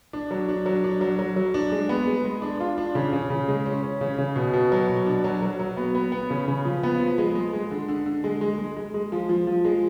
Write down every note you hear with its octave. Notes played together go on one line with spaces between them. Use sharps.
D4
F#3
D4
F#3
D4
F#3
F#3
F#3
D4
G#3
B3
G#3
G#3
D4
F4
D4
C#3
C#3
C#3
G#3
C#4
C#4
C#3
C#3
B2
B2
F#3
B2
D4
F#3
F#3
F#3
B3
B3
B3
C#3
C#3
F3
B3
F3
G#3
G#3
G#3
D3
D3
D3
G#3
G#3
G#3
G#3
G#3
F3
F3
F3
G#3